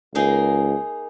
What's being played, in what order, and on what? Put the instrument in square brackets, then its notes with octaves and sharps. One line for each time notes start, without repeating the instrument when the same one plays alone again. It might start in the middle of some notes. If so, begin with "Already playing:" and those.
[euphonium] C#2 [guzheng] A#3 D#4 G#4